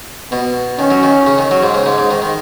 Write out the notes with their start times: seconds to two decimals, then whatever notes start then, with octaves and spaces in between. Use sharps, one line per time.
0.32 B2 B3
0.79 D#3 C#4
0.91 F#3
1.03 D#3
1.27 C#3
1.38 D#3
1.51 F#3
1.63 G#2
1.74 C#3
1.86 G#2
1.98 G#2
2.11 D#3
2.22 D#3